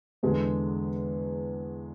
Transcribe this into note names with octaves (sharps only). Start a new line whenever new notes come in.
E2 D3 G#3